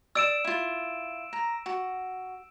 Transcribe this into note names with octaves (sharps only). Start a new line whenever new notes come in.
D5 D#6 E6 D7 E7
E4 F4
A#5
F#4